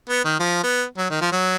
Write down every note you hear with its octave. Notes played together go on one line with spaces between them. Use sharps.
B3
D#3
F3
B3
F#3
D#3
F3
F#3